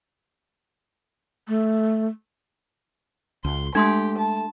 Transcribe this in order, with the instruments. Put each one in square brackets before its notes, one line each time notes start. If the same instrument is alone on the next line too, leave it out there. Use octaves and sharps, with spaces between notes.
[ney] A3
[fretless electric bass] C#2 [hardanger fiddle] C6
[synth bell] G#3 [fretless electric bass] A3 [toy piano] D4 C6 D#6 [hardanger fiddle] G4
[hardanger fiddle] A5